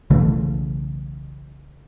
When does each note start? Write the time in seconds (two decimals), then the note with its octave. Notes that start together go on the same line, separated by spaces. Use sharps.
0.10 B1 C#3 E3 A3